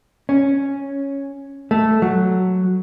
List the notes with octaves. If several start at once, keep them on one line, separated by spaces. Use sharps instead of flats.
C#4
A3
F#3